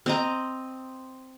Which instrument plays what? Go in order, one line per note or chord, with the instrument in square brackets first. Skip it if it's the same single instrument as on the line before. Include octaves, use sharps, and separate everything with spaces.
[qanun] C4 D#5 A#5